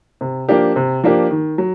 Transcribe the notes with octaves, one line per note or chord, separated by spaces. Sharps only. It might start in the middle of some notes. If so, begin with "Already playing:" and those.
C3
F3 A#3 D4 G4
C3
F3 A#3 D4 G4
D#3
F#3